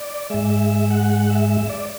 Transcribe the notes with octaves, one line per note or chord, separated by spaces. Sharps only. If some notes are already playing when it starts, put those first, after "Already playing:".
Already playing: D5
G#2 G#3 E5
E5
E5
F#5
F#5
E5
E5
D5